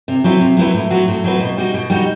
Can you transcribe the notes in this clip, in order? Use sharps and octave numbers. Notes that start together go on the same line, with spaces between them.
C3
F#3 C4 E4 B4
C3
F#3 C4 E4 B4
A2
F#3 C4 F#4 B4
A2
F#3 C4 F#4 B4
B2
G3 D#4 F#4
B2
G3 D#4 F#4